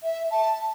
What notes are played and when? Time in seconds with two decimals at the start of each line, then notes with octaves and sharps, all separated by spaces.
0.03 E5
0.31 A5